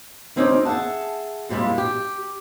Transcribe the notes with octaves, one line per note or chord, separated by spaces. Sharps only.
D2 C4 C#4 D#4 D5
G#4 E5 F#5 A5
F2 A#2 G3 G#3 E4
G4